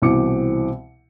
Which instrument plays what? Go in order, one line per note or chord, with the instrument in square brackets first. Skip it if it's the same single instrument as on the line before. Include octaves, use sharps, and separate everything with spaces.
[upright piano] C2 B2 E3 C4 D6 C#7